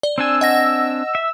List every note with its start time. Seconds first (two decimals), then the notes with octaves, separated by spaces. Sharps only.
0.03 D5
0.18 C4 D4 G#5 E6
0.41 D#5 F#5 A#6
1.15 E5